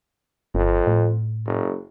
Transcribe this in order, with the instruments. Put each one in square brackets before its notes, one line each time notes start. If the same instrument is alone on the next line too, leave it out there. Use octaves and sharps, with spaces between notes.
[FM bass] G1 [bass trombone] F2
[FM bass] A2
[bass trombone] F#1